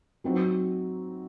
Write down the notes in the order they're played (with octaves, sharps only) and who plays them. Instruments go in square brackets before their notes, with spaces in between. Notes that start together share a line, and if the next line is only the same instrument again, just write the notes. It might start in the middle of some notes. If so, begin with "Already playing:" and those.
[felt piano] F#3 C4 D#4 F#4